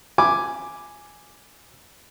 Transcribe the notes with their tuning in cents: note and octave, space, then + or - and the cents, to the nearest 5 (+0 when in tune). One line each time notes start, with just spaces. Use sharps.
G#5 +0 B5 +0 D6 +0